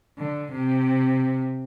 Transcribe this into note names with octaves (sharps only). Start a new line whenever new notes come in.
D3
C3